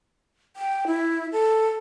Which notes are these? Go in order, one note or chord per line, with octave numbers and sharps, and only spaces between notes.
G5
E4
A4